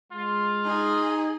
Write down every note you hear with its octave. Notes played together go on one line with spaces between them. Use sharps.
G#3 F4
D#4 G#4